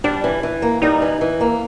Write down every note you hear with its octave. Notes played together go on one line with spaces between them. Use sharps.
G3 D4
E3
E3
A#3
G3 D#4
E3
E3
A#3